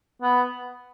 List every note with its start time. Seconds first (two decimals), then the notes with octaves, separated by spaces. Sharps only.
0.22 B3